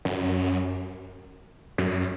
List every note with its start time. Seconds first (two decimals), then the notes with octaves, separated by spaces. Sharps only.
0.05 F#2
1.78 F#2